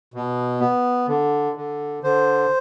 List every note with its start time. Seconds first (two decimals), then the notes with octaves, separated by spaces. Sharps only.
0.14 B2
0.60 B3
1.08 D3
1.56 D3
2.03 D3 C5